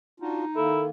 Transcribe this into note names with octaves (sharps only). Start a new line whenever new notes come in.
D4 D#4 F4 F#4
D#3 A#3 E4 A4